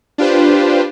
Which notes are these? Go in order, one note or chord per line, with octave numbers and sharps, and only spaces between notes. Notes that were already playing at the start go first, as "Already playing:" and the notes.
D4 F4 G4 B4 C5